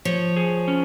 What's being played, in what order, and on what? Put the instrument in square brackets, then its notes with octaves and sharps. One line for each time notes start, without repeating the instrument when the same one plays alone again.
[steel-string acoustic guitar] F3 [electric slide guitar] C#5
[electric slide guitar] G#4
C#4